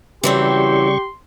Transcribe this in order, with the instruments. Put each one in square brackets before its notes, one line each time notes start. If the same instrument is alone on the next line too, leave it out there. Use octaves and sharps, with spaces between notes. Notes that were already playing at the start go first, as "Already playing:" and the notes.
[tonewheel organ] C#3 G3 C#6 [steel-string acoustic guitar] E3 F#3 C4 [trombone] G4 [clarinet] C6